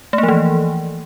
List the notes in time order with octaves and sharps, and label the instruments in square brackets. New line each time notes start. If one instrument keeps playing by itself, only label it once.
[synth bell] A3
A#3
F3
E3